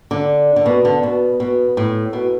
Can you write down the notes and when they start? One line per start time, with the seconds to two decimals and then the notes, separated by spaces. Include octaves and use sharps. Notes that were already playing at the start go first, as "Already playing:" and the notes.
0.11 D3
0.56 D3
0.66 B2
0.85 D3
1.03 B2
1.40 B2
1.77 A2
2.13 B2